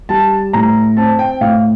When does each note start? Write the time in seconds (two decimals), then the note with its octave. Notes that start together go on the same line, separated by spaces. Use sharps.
0.09 G3 A5
0.53 A2 A#5
0.97 C4 A5
1.19 G5
1.41 A2 F5